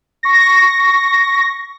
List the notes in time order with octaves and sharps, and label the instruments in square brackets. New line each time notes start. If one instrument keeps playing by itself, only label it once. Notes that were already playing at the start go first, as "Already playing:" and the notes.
[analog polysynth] C#6 A#6